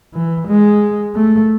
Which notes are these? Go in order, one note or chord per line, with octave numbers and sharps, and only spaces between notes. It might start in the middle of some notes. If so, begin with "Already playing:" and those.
E3
G#3
A3